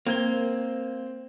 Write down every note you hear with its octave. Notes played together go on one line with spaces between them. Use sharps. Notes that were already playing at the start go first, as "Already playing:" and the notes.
A#3 C4 G#6 G7